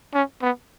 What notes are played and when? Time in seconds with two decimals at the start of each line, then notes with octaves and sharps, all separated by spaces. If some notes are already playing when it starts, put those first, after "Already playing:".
0.14 C#4
0.42 B3